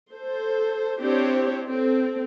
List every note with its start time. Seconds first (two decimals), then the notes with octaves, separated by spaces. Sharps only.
0.10 A4 C5
0.99 C4 D4 E4 G4 C5 C#5
1.67 C4 A4